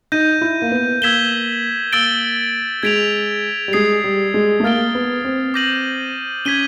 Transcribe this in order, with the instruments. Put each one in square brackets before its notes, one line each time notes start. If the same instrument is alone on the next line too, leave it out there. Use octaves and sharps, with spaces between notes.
[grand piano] D#4 [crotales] G6 A#6 D#7
[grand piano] E4
A#3
B3
[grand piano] A#3 [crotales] E6 G#6 B6 E7 G7
[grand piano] A#3 [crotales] E6 A6 D7 G7
[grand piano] G#3 [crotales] G#6 B6 D7 F7
[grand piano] G3
[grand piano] G#3 [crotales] D#6 G#6 C7
[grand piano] G3
G#3
A3
[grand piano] A#3 [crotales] F6 A6 D7 G7
[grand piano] B3
C4
[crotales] D6 G6 A#6 D#7 F#7
[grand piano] C#4 [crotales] G#6 B6 D#7 G7